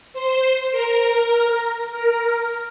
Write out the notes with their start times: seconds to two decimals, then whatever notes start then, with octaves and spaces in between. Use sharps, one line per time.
0.13 C5
0.72 A#4
1.90 A#4